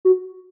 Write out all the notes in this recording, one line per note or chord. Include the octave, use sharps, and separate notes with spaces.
F#4